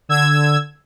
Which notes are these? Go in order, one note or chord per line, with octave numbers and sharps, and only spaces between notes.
D3 E6 G#6